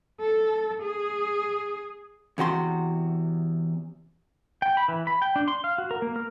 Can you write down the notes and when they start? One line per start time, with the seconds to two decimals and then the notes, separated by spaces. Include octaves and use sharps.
0.20 A4
0.83 G#4
2.38 E2 C3 F#4 C6
4.62 G5
4.77 B5
4.88 E3
5.07 B5
5.22 G5
5.36 D4
5.48 C6
5.64 F5
5.78 F#4
5.91 A#4
6.02 A#3
6.16 A#4